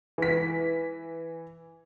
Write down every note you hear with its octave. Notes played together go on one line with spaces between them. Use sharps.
E3 B6